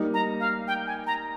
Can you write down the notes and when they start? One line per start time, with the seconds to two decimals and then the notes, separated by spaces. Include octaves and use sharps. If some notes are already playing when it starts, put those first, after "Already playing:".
Already playing: G3 A#3 D#4
0.14 A#5
0.40 F5
0.67 G5
0.87 G#5
1.07 A#5